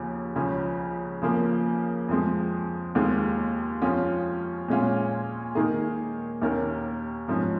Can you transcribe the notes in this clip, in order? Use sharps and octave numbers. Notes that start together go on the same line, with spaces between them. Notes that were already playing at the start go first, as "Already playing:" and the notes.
Already playing: D#2 C#3 F3
C#2 C#3 F3 C#4
C#3 F3 A#3
F2 F3 G#3
D#2 D#3 G#3 F4
F2 F3 C#4 F4
A#2 G#3 C#4 F4
D#3 A#3 D#4 G#4
D#2 D#3 C#4 A#4
G#2 F3 C#4